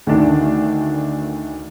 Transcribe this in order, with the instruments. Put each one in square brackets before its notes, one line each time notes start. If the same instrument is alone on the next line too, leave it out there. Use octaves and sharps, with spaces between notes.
[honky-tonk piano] D2 D#3 D4